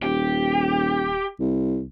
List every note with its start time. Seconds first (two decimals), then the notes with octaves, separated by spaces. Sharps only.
0.03 D#1 G4
1.40 C2